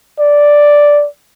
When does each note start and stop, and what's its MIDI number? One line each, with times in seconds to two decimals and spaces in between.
0.19 1.07 74